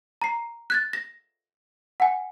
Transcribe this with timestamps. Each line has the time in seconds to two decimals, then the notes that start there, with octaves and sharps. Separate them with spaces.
0.22 A#5 C7
0.70 F#6 G#6 A6
0.93 A#6
2.00 F#5 G#5